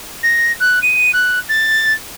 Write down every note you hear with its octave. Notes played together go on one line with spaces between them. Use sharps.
A#6
F#6
D#7
F#6
A6